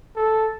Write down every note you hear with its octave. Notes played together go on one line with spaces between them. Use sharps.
A4